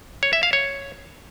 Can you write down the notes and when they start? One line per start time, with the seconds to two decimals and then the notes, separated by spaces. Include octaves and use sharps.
0.23 C#5
0.33 E5
0.43 F5
0.53 C#5